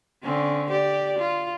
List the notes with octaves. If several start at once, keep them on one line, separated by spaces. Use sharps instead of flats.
D3 C4 C#4
G4 D5
F4